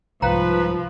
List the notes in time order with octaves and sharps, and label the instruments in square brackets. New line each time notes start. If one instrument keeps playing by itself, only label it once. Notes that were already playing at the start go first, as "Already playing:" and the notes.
[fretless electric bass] C2 G#2 [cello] F3 [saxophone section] B4 [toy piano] F5 G5 A#5